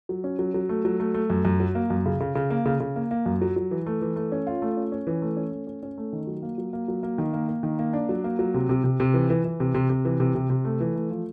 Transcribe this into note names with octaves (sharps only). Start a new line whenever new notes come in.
F#3
C#4
F#3
F#3
A3
F#3
A3
A3
F#2
F#2
F#3
A#3
F#2
C#3
C#3
C#3
A#3
C#3
C#3
A#3
A#3
F#2
F#3
F#3
E3
A3
E3
A3
C#4
F4
A3
C#4
C#4
E3
A3
C#4
A3
C#4
C#4
A3
D#3
F#3
A#3
F#3
A#3
F#3
A#3
D#3
A#3
A#3
D#3
A#3
D4
F#3
A#3
F#3
C3
C3
C3
C3
E3
E3
E3
C3
C3
C3
E3
C3
C3
C3
A3
E3
A3
F3